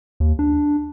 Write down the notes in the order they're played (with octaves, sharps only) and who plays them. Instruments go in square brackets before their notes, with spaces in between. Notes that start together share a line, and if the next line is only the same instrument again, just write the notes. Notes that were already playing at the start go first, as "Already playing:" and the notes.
[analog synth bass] D#2
D4